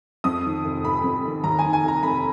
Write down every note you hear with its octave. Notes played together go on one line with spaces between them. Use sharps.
F2 D#6
D#3
F1
F1 B5
F2
D#3
D#2 A#5
D#3 G#5
G#5
F1 A#5
F1 B5